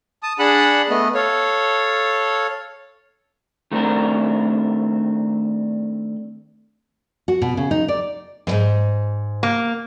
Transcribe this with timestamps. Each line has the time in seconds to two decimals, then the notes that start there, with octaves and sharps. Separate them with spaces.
0.23 A5 D#6
0.39 D4 G#4 F#5 A5 B5
0.90 A3 B3 D#5
1.15 A4 C#5 F5
3.72 D#3 A3 C4 D4 A#4
7.28 F#4
7.42 B2
7.57 C#3
7.71 D#4
7.88 D5
8.47 E2 G#2
9.43 A#3